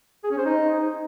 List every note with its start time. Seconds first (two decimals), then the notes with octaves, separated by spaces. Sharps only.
0.24 G#4
0.31 C#4
0.38 C5
0.45 D#4